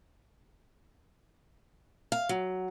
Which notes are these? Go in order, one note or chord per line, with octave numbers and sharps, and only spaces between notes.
F5
F#3